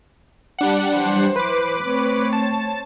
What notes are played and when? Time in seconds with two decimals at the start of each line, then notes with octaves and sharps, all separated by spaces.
0.59 G3 D4 F#5
0.89 E3 F#3 C5
1.36 B4 D6
1.82 A3 C4 C#5
2.33 A5